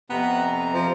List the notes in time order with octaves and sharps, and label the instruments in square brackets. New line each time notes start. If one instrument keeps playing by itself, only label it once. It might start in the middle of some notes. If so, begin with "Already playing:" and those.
[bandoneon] F2 C3 A#5 [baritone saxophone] B3
[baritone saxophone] F3